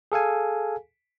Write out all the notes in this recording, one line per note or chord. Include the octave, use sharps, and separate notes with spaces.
G#4 A4 F5 G#5